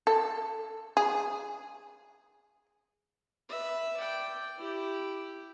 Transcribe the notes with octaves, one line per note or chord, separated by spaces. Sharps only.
A4
G#4
B4 E5
D5 G5
E4 G4